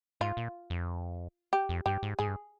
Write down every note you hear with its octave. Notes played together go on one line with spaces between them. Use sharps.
G#2 F4
A#2
F2
G4
F2
G2 G4
G#2
G#2 G#4
G2